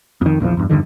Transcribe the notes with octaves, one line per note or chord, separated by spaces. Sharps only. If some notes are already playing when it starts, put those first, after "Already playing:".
F2 D#3
A#1 E2 C#3 F3
E2 G2
E2 G2 D3 D#3